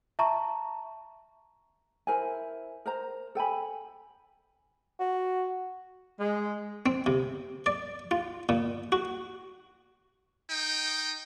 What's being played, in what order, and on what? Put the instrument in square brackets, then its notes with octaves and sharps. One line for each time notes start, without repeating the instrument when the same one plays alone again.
[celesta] E5 A5 A#5 C#6
[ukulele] E4 A#4 C5 G#5
A#4 C5 A#5
A4 G5 G#5 B5
[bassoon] F#4
[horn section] G#3
[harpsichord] C4
C3
D5
F4
A#2
F#4
[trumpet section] D#4 G5